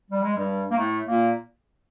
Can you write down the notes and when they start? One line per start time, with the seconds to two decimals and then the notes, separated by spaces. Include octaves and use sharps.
0.10 G3
0.22 G#3
0.35 G2 G3
0.71 A#3
0.76 A2 A3
1.08 A#2 A#3